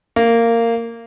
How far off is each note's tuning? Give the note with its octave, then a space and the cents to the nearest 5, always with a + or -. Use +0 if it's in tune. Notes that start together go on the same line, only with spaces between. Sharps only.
A#3 -15